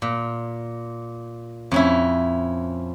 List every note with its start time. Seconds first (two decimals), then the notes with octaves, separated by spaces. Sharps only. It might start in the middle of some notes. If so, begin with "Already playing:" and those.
0.02 A#2
1.72 F2 C#4 E4